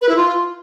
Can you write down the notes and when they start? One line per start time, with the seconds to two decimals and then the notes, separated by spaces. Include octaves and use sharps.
0.02 B4
0.09 E4
0.16 F4